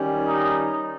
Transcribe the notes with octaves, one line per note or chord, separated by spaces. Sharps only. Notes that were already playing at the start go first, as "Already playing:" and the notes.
Already playing: D#3 G3 C#4
D#4